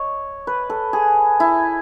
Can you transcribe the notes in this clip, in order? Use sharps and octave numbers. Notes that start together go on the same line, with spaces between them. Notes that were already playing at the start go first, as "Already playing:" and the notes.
Already playing: C#5 D#5
B4
A4
G#4
E4